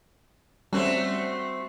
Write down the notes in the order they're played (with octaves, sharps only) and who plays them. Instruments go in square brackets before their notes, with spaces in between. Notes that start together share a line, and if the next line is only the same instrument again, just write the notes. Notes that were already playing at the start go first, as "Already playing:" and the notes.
[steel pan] G3 C#4 C5 [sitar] A3 C4 F#4